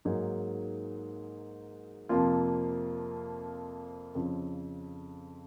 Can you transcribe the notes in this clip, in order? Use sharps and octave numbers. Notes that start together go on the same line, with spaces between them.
G#2 F#3 A#3 D#4 G#4
F2 C3 F3 A#3 F4
F2 C#3 F3